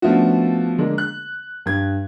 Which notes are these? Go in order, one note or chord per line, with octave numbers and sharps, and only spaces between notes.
F3 A3 B3 C#4 D4 F#4
D3 G#3 A#3 D4
F#6
G2 G#6